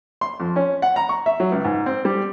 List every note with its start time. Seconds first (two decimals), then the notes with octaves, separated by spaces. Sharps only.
0.21 C6
0.40 F2
0.56 C#4
0.82 F#5
0.96 A#5
1.09 C#6
1.26 E5
1.40 F#3
1.52 C#2
1.64 G#2
1.86 C4
2.05 G3